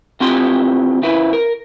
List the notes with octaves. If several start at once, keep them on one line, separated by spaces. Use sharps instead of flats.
E3 C4 F4 G4 C6
C#3 E4 B4
A#4